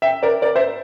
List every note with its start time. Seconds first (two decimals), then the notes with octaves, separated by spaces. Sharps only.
0.02 E5 G5
0.23 A#4 D5
0.42 A#4 D5
0.56 C5 E5